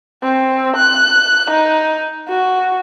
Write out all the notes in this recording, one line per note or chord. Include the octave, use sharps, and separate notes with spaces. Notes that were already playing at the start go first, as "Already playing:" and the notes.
C4
F#6
D#4
F#4